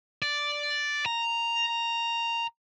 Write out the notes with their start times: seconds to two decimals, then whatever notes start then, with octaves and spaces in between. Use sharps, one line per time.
0.22 D5
1.06 A#5